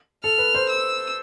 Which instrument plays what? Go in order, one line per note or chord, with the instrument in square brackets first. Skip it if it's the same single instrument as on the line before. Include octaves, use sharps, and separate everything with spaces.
[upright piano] A4 [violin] F6
[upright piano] B4
C5
[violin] E6